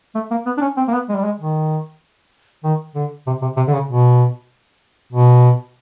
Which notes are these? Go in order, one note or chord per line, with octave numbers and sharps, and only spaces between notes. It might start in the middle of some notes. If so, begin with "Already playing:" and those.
A3
A#3
B3
D4
C#4
C4
A#3
B3
G#3
G3
G#3
D#3
D#3
D3
C3
C3
C3
D3
C#3
B2
B2